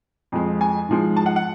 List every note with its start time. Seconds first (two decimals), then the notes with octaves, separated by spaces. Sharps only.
0.32 F2 F3 G#3
0.61 G#5
0.89 G#2 F3 G#3
1.16 A5
1.26 F#5
1.36 F#5